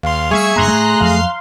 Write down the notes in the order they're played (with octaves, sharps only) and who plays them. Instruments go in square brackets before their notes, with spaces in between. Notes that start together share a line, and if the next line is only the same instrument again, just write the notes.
[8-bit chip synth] D#2 C6 [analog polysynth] F5
[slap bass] G3 A3 [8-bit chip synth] G#4 [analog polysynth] E5 C#6 G#6
[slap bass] F#1 G2 A#3 [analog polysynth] A#5 C6 F#6
[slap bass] A2 [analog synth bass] A3
[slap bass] F2 F3 F#3 [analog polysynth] F5 C6